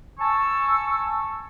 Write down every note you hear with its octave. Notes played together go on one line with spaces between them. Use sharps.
G#5 A5 C#6 E6